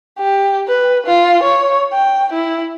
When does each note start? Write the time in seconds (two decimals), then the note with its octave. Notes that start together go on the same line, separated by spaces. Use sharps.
0.19 G4
0.68 B4
1.06 F4
1.43 C#5
1.93 G5
2.33 E4